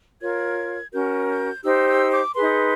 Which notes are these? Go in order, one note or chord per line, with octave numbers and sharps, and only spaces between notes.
F4 A#4 C#5 G#6
C#4 F#4 A#4 G6
G6
D#4 G4 C5 E6
E6
D6
D#4 G#4 B4 C6